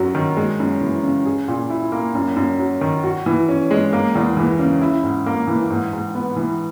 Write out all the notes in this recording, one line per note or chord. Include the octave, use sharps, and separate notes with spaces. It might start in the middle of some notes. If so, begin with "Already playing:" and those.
Already playing: F#2 F#3
D#3
G#3
F#2
E3
C#3
G#4
A#2
E4
A#3
F#2
F#2
F#3
D#3
F#4
E3
C#4
G#3
A#3
E2
E3
C#3
E4
G#2
A#3
E3
G#2
G#2
B3
E3